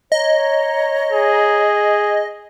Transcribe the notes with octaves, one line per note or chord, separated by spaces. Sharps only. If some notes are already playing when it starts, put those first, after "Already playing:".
C#5 D#5 A#5
G#4